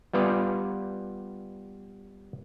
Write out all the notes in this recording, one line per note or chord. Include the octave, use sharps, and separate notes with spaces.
G3 B3 F4 B4 D5 F5